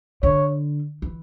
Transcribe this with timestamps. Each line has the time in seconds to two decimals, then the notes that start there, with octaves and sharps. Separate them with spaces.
0.23 D3 C#5
1.02 E3